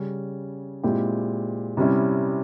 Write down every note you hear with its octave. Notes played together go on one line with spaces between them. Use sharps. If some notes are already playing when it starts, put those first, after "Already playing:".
Already playing: C#3 G3 C#4
A#2 G#3 C4 E4 G4
C3 G3 C#4 E4